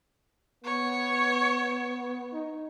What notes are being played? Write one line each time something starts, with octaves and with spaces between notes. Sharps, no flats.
B3 C#5
D#4